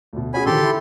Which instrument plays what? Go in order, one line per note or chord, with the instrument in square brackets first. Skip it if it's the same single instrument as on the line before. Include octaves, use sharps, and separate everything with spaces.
[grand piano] D2 B2
[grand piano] C#4 F#4 G#4 [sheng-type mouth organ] G#5 B5
[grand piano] D3 D#3 F3 [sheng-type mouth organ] G4 A4 C6
[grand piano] E4 B5